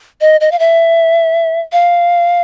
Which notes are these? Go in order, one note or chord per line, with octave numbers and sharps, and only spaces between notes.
D#5
D#5
F5
E5
F5